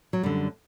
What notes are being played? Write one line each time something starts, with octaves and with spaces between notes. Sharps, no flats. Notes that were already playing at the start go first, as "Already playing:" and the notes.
F#3
F#2 D3 G3